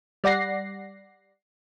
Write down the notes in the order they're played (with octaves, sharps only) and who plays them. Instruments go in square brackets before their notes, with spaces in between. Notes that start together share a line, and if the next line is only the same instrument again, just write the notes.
[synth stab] G3 D5 F#5 A#6 C7